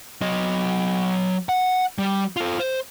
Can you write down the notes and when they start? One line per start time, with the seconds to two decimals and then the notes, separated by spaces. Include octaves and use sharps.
0.22 F#3 D#5
1.49 F#5
1.99 G3
2.37 F4 A4
2.59 C5